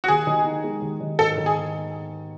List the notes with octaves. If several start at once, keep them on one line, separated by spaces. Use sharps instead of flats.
F#4
D#2 G#4
D#3
D#4
G#3
D#2
D#3
G#2 A4
D#3
G#4